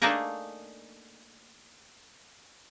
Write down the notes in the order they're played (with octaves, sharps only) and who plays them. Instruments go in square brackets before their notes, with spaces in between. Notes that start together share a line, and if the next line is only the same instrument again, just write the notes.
[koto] A3 A#3 D4 D#4 G#4 A#4